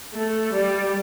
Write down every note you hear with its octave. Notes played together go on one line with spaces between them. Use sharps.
A3
G3